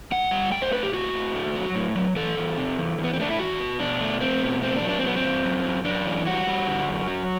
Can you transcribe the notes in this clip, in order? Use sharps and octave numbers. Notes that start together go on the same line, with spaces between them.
G3 F#5
G3
A3 G5
C5
A2 B4
G4
A2 F#4
A2
A3
F#3
A2
F#3
E3 A4
E2
C3
E2
E2
B3
C4
A3 D4
E4
E2 F#4
B2
B2 D4
A3
A3 C4
B2
A3 C4
D4
F#3
D4
C4
F#3 B3
C4
G2
F#2
F#2
F#2 D4
E3
G3 F#4
G3
D3
F#2
F#3